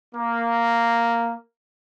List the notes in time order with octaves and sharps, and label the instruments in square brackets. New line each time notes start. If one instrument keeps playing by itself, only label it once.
[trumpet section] A#3